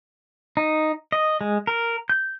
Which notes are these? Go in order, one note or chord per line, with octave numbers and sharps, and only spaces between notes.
D#4
D#5
G#3
A#4
G6